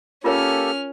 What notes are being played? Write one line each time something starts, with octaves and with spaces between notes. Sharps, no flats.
A#3 C#4 F4 G4 A4 A#4 C#5 F6